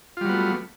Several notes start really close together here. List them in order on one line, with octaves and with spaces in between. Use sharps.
F4 G3 F#3 B3 A3